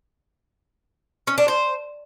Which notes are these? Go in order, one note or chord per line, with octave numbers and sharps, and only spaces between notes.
C#4
D4
C5